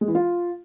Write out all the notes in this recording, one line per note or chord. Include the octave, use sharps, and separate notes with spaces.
G#3
E3
F4